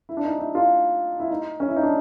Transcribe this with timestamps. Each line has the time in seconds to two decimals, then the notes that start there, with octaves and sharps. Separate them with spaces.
0.09 E4
0.17 D4
0.25 D#4
0.39 E4
0.55 F4
1.20 E4
1.31 D#4
1.60 C#4
1.68 E4
1.76 D#4
1.83 D4